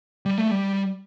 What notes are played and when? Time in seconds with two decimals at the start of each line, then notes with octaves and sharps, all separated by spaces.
0.26 G3
0.38 A3
0.51 G3